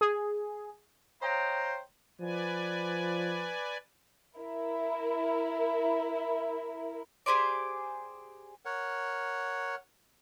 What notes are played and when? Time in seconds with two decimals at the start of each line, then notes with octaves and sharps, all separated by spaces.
0.01 G#4
1.22 C5 C#5 D#5 F5 G5 A#5
2.21 F3 B4 D5 G#5
4.38 E4 A#4
7.26 G4 G#4 C5 D5
8.65 A#4 C#5 F#5